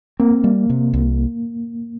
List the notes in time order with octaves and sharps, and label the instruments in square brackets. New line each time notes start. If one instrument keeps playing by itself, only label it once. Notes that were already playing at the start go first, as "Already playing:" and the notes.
[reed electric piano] A#3 [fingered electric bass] C4
[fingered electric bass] G3
C3
C2